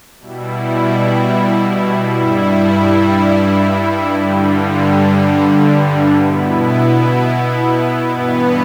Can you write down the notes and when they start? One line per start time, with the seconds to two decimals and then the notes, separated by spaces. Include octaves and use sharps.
0.19 B2 G3 E4
2.17 G2 G3 E4
4.15 G2 D3 G3
6.14 B2 B3 E4
8.12 G2 E3 B3